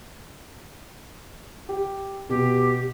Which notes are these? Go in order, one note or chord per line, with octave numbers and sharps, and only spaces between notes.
G4
B2 G4